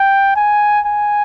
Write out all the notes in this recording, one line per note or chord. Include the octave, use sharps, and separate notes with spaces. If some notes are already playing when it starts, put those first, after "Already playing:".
Already playing: G5
G#5
G#5